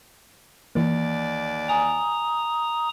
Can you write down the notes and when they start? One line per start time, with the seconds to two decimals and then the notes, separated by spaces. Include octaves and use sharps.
0.75 D#2 E3 A#3 D5
1.69 G#5 A#5 D#6